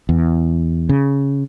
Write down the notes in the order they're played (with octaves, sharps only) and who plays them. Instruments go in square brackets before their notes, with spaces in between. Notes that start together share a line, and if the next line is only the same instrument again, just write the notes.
[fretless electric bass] E2
C#3